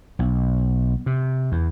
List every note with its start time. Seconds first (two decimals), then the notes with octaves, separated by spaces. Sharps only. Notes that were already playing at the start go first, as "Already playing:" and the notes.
0.19 B1
1.06 C3
1.52 E2